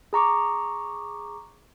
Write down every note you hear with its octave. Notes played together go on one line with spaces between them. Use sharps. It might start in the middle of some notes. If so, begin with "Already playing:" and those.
G#4 A#5 C#6 D6